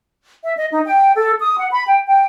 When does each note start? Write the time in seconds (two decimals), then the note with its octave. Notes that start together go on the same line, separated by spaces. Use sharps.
0.43 E5
0.56 D#5
0.71 D#4
0.85 G5
1.16 A4
1.40 D#6
1.58 F#5
1.70 B5
1.87 G5
2.06 G5